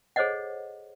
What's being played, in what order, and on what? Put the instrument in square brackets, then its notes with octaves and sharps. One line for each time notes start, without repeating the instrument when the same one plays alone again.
[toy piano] G#4 A4 C5 C#5 D#5 F#5